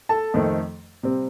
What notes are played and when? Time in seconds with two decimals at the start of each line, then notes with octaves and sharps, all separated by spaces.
0.09 A4 A5
0.34 F2 D#3 A3 C4
1.03 C3 G3 C4